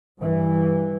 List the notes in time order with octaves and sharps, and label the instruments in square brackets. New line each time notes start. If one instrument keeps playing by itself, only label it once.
[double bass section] G2 E3